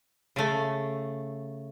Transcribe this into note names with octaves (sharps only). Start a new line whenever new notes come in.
C#3 A3